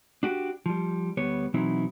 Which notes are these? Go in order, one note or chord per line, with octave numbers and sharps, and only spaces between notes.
D4 F#4 G4
F3 G3
D2 G3 B3 C#5
B2 E3 F#3 C4 D#4 E4